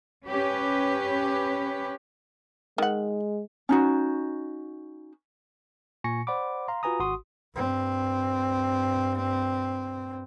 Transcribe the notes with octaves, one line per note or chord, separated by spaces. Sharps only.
C#4 G4 B4
D#3 G#3 F#5
C#4 D#4 F#4
A#2 G#5 C#6 A#6 C#7
C5 D5 F#5 B5 D6
F5 A#5 C6
F4 F#4 B4 G#5 A#5 D#6
G#1 F#4 C6 D#6
G2 C4